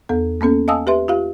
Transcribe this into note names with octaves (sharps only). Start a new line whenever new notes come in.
E2 B3 A4
A#3 B3 C#4 A4
D#5 F5 G#5 A5 D#6 E6
G4 B4 E5 C6
F4 G4 F5